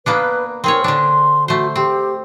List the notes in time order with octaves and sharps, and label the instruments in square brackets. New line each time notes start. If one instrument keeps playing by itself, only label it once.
[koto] A#3 B3 D4 [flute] B4
[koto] C4 G#4 C#5 [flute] A#4
[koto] D3 D4 [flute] C6
[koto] A3 C5 [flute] F#4
[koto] C4 [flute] G4